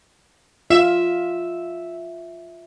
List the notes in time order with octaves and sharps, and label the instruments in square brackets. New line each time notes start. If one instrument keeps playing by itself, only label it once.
[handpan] F4 [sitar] E5